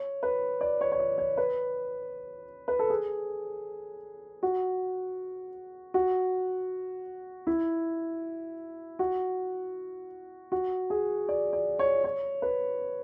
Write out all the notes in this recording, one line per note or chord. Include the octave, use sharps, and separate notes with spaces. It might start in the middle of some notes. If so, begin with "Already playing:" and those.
Already playing: C#5
B4
D5
C#5
C#5
D5
C#5
B4
B4
A4
G#4
F#4
F#4
E4
F#4
F#4
G#4
D5
D5
C#5
C#5
B4